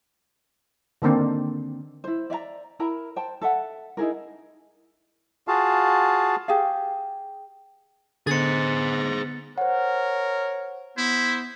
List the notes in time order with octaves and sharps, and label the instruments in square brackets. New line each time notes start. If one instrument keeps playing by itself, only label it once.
[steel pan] D3 D#3 A#3 C4 D4
[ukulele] E4 C5
D5 E5 F5 A#5
E4 A#4 A#5 B5
C5 G5 A5
A4 E5 F#5
D#4 E4 G#4 A#4
[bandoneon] F4 F#4 G#4 F5 A5
[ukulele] G4 G#4 F5
[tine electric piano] D3 [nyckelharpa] B3 [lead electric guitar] G#4 C5 [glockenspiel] A6 C#7
[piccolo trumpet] A#4 [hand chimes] C5 F#5 [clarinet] C#5
[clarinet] B3 [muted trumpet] E4 [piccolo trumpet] C5